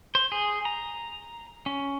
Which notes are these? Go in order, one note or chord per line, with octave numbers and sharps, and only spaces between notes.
C5
G#4
A#5
C#4